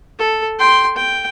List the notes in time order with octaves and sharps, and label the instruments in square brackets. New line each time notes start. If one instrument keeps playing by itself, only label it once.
[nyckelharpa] A4
G5 C6
G5